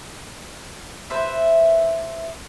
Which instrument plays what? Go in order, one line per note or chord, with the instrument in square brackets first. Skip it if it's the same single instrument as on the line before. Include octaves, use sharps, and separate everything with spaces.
[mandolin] B4 C5 E5